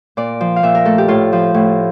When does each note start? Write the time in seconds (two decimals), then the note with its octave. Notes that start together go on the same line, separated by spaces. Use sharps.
0.17 A#2 D5
0.41 F3
0.56 F5
0.63 A#2 E5
0.75 A#4
0.85 A3 A4
0.98 G4
1.08 A2 F4
1.33 F3
1.54 A2